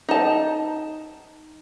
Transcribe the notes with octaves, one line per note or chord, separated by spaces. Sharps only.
D#4 A5